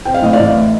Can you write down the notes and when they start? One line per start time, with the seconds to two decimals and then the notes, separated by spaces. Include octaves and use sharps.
0.05 C4 G5
0.14 F5
0.23 A2 D#5
0.33 D5 F5
0.39 A1
0.56 A3